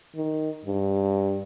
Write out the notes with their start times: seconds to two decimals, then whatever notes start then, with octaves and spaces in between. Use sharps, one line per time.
0.16 D#3
0.65 G2